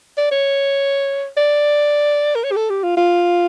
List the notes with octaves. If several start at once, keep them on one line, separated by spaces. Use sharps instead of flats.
D5
C#5
D5
A#4
C#5
G4
A4
G4
F4
F4